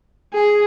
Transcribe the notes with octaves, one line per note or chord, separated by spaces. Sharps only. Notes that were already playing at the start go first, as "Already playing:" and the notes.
G#4